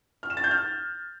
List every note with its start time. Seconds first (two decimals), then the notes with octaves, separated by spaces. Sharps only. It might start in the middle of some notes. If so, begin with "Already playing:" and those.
0.23 F6
0.30 E7
0.37 A6
0.44 G6
0.51 F6